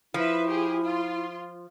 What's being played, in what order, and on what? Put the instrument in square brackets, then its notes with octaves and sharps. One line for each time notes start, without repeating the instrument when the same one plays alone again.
[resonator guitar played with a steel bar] F3 [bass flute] E4 [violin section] B4 E5
[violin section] G4 G#4
F4 C6